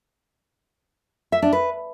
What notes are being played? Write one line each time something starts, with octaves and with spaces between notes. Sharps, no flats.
E5
D4
B4